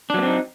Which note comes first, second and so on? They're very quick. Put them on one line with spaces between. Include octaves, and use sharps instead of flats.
D4 F#3 B3 C4 D#4